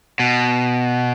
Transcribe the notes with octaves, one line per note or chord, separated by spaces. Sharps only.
B2